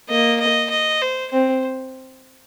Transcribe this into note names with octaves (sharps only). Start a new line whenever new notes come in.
A#3 D#5
D#5
D#5
C5
C4 C5